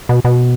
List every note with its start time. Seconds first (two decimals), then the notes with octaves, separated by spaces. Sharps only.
0.09 B2
0.25 B2